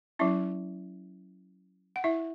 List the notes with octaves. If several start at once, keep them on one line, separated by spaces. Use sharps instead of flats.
F#3 C#4 E4 E5
F#5
E4 E5